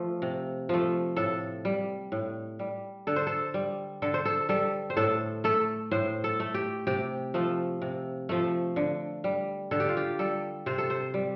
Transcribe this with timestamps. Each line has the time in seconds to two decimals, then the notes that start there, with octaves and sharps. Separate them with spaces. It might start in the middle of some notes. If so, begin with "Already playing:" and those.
Already playing: F3 A3
0.22 C3
0.69 F3 A3
1.16 A2 A4
1.65 G3
2.12 A2
2.59 G3
3.07 D3 A4
3.16 C5
3.27 A4
3.54 G3
4.02 D3 A4
4.14 C5
4.25 A4
4.49 G3 A4
4.90 C5
4.97 A2 A4
5.44 A3 A4
5.91 A2 C5
6.24 A4
6.40 A3
6.54 G4
6.87 C3 G4
7.34 F3 A3
7.82 C3
8.29 F3 A3
8.76 D3
9.24 G3
9.71 D3 A4
9.80 G4
9.89 F4
9.97 G4
10.19 G3 A4
10.66 C3 C5
10.78 A4
10.90 C5
11.14 G3